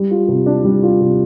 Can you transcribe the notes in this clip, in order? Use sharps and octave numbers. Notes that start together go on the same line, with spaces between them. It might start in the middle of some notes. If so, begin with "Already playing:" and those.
Already playing: G3
F4
C3
D4
G3
F4
C3